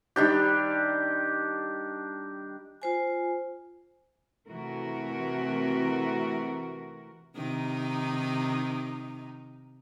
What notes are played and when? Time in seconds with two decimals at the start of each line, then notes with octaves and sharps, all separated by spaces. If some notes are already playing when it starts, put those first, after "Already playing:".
0.16 D#3 G3 D4 G4
2.82 F4 C5 G#5
4.47 C3 E3 A3 F#4 A#4
7.36 C3 D#3 D#4